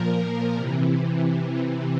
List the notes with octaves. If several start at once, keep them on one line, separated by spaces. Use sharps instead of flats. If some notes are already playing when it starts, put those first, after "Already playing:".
Already playing: A#2 F3 A#4
C3 E3